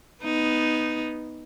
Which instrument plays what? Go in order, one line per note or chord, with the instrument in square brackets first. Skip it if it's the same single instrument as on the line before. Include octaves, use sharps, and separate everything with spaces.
[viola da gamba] B3 D#4